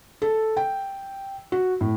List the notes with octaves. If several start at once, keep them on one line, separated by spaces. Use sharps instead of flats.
A4
G5
F#4
A2